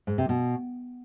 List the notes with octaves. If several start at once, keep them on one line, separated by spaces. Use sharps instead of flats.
G#2
C3
B2